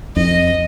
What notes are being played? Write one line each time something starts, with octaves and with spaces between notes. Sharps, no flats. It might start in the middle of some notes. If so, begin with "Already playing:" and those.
F2 D#5